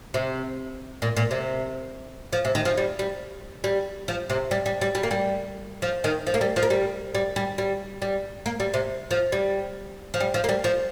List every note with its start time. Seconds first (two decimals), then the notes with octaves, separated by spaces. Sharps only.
0.14 C3
1.02 A#2
1.17 A#2
1.31 C3
2.33 F3
2.45 C3
2.55 D#3
2.65 F3
2.77 G3
2.99 G3
3.64 G3
4.08 F3
4.30 C3
4.51 G3
4.66 G3
4.81 G3
4.95 G3
5.03 A#3
5.11 G3
5.82 F3
6.04 D#3
6.27 F3
6.34 A#3
6.41 G3
6.56 F3
6.63 A#3
6.70 G3
7.15 G3
7.36 G3
7.58 G3
8.02 G3
8.46 A#3
8.60 G3
8.74 C3
9.11 F3
9.32 G3
10.14 F3
10.20 G3
10.34 F3
10.44 A#3
10.49 G3
10.64 F3